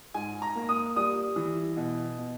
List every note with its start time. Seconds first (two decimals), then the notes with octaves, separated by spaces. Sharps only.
0.14 G#2 G#5
0.42 A#5
0.55 A#3
0.69 D#6
0.96 G3 D#6
1.36 E3
1.77 B2
2.18 B2